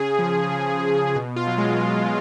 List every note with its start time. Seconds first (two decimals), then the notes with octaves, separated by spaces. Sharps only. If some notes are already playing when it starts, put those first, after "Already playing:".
Already playing: C#3 G#4
0.19 F3
0.51 C#3
0.83 F3
1.16 B2
1.36 F4
1.47 F#3
1.58 G#3